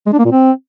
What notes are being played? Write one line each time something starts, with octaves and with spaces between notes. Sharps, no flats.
G#3
D4
A#3
A#2
C4